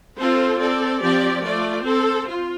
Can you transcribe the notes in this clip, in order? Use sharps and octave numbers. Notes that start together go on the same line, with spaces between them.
C4 F4 A4 C5
C4 A4 D5
F3 C4 G4 D5
A3 F4 D5
C4 A4 C5
F4